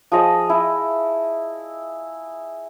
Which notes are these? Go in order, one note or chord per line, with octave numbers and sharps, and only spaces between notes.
F3 G#4 D#5
E4